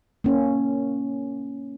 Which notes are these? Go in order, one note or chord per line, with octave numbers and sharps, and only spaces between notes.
A#3 C#4